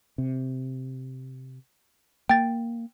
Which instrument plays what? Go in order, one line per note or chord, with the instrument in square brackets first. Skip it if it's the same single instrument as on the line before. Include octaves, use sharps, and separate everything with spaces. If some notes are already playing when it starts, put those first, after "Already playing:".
[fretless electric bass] C3
[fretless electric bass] A#3 [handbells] G5 A6